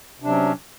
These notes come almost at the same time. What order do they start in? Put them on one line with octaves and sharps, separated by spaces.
C3 D4 F#3 C#4